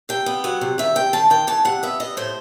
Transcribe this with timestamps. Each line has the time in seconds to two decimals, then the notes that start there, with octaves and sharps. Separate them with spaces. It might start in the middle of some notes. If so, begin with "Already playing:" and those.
0.09 C3 G5
0.26 B3
0.44 F#3 F#5
0.61 C3
0.78 D#3 E5
0.95 C3 G5
1.13 D#3 A5
1.30 D#3 G5
1.47 E3 A5
1.65 C3 F#5
1.83 B3 E5
2.00 B3 D#5
2.17 A2 C5